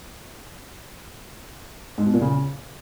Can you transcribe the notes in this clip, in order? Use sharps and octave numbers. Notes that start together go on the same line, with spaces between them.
G#2
B2
A#2
C#3